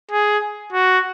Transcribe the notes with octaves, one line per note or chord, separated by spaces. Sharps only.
G#4
F#4